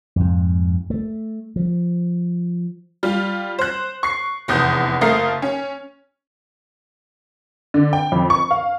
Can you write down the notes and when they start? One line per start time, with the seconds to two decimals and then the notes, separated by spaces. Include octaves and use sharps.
0.16 F2 G#2
0.90 A3
1.56 F3
3.03 G3 F4
3.59 C5 F#6
4.03 C#6 C7
4.48 F1 E2 D#6 G6
5.01 F#1 A3 A#4 F5 D#6 C7
5.42 C#4
7.74 D3
7.93 G5
8.12 F2
8.30 C#6
8.51 F5